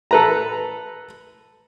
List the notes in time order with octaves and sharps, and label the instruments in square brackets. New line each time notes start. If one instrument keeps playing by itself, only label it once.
[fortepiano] A4 B4 A#5